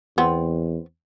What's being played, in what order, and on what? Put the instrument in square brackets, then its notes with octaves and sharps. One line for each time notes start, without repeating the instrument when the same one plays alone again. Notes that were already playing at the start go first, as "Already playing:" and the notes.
[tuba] E2 [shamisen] B3 C4